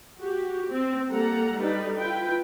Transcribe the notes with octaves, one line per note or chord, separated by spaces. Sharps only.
F#4 G4
C4
G3 A#3 A4 F#5 A#5
G3 D4 D#4 A4 B4 D5
E4 F4 B4 G5